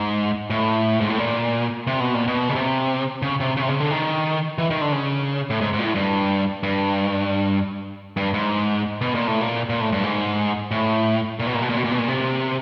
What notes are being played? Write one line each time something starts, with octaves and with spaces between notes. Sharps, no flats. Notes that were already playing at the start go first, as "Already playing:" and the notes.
Already playing: G#2
A2
G#2
A2
A#2
C3
B2
A#2
B2
C#3
C3
C#3
C3
C#3
C3
C#3
D3
D#3
E3
D#3
D3
C#3
A2
G#2
G#2
A#2
A2
G2
G2
G2
G#2
B2
A#2
A2
A#2
A#2
A2
G2
G#2
A2
A#2
B2
A#2
B2
A#2
B2
A#2
B2
A#2
C3